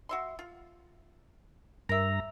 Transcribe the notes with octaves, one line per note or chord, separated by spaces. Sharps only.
F#4 E5 C6
F4
G2 A#4 E5 A#5